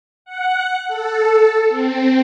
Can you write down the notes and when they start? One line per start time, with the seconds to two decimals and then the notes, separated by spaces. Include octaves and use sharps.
0.25 F#5
0.88 A4
1.69 C4